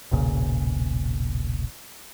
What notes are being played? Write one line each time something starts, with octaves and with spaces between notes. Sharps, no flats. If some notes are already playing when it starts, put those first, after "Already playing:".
E1 B1 A#2 C#3